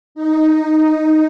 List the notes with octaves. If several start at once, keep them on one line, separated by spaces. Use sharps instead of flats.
D#4